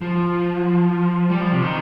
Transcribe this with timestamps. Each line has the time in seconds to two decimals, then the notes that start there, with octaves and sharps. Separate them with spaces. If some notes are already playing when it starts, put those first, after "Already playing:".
0.01 F3
1.30 G3
1.41 F3
1.52 C3
1.62 D#3